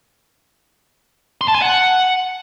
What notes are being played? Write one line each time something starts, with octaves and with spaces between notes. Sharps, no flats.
C6
A5
G#5
F#5